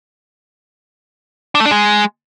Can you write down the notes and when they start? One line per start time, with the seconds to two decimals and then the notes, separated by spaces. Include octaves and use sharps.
1.55 D4
1.60 A3
1.66 D4
1.71 G#3